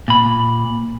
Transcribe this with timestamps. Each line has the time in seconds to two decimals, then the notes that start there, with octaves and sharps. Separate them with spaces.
0.08 A#2 B5